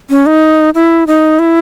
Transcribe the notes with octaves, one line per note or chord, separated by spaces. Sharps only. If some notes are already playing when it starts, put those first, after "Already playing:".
C#4
D#4
E4
D#4
E4